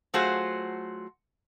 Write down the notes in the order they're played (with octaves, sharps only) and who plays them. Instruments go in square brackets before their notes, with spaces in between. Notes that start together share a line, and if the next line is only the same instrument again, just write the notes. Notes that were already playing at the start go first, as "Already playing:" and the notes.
[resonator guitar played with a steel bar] F#3 A3 F4 F#4 G#4 C5